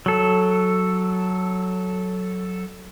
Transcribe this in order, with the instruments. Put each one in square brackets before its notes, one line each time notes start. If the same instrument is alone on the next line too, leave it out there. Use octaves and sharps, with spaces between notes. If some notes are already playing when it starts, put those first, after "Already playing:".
[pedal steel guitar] F#3 A4